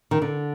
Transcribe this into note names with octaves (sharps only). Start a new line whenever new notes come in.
D#3
D3